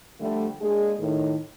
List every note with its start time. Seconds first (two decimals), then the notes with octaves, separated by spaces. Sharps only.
0.20 D3 F3 G3 A3
0.61 G#3 A#3 D4 G#4
0.99 A2 D#3